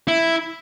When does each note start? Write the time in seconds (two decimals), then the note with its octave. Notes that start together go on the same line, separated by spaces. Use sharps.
0.08 E4